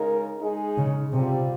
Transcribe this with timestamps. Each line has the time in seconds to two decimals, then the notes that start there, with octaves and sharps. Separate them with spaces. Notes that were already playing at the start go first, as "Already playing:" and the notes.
Already playing: C#3 G#3 D#4 A#4
0.41 G#3 D#4 G#4
0.77 C#3
1.12 C3 G3 C4 F4